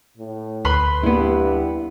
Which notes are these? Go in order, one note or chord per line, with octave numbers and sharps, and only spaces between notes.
A2
D2 B4 B5 C6
G2 B3 E4